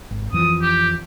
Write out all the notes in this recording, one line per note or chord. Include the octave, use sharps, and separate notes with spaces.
G#1
F2 E3 F3 D#6
G4